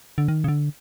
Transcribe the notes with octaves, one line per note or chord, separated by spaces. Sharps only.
D3
D#3
C#3
D3